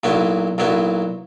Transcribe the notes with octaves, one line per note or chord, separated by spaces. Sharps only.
B1 A#2 F#3 B3 E4
B1 A#2 F#3 B3 E4